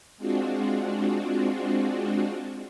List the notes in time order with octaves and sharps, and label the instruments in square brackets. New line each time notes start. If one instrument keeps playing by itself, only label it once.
[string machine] G#3 C4 D4 F4 F#4